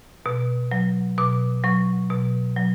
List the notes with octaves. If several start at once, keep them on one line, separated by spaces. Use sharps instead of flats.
B2
F#3
B2 D6
F#3 C#6
B2
F#3